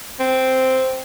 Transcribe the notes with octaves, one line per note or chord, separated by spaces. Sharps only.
C4